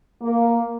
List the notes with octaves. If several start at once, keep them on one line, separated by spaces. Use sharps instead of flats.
A#3